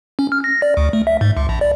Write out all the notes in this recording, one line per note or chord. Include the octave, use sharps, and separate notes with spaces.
C#4
F6
A#6
D5
D2
A3
E5
G#2
C#2
A#1
D5